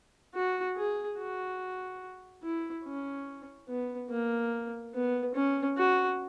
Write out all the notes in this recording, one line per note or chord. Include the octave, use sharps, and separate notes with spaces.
F#4
G#4
F#4
E4
C#4
B3
A#3
B3
C#4
F#4